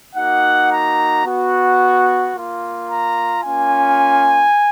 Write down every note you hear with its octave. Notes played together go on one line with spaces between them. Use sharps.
A#3 D#4 F#4 F#5
A#5
B3 F#4
A#3 F4
A#5
A#3 C#4 F4 G#5